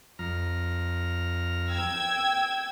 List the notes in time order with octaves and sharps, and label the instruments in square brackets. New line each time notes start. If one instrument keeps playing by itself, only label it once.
[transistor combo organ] F2 A#5 F6
[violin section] G5 E6 G#6